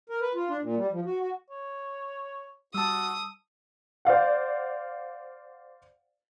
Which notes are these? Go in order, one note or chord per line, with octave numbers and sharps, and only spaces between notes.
A#4
B4
F4
D4
A#2
G3
F3
F#4
F#4
C#5
G3 F#4 A5 D#6 E6
C5 D5 F5 F#5